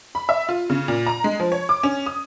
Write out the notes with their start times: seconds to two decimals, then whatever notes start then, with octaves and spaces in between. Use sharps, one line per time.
0.15 B5
0.29 E5
0.49 F4
0.70 C#3
0.88 A#2
1.07 A#5
1.24 G#3
1.40 F3
1.52 C#5
1.69 D6
1.83 C#4
2.06 D#6